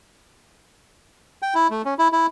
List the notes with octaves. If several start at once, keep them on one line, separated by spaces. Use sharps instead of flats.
G5
E4
A3
C#4
E4
E4